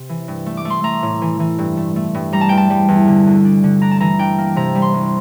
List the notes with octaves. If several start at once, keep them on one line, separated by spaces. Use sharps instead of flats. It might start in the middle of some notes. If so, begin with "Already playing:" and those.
Already playing: C3
E3
G2
A3
D6
A3
C6
A3 A#5
A2
E3
E3
G2
A3
A3
G2
G3 A#5
A5
E2 G5
A5
G3
E2
D3
D2
D4
D3
D4 A#5
A5
E3 A#5
D4 G5
A#3
C3 A#5
G3
C6
C2